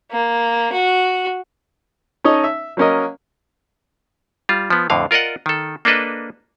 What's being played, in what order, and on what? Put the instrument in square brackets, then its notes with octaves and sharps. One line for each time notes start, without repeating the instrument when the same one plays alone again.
[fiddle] A#3
F#4
[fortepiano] C#4 D#4 A4 C#5 D#5
E5
F#3 A#3 C#4 A#4 D#5
[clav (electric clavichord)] G3 F4
F3 B3
F2 A2 D3 F5
F4 A#4 D5 D#5 F#5
D#3 A4
A#3 D4 A4 B4 D#5